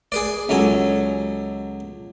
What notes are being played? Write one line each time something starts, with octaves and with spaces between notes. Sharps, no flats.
G#4 B4 D5
C#2 F#3 A4 G#5